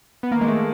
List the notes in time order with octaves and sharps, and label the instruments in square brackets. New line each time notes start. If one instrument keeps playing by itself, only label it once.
[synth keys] B3
[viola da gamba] D#3 [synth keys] A#3
[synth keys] G#3
A3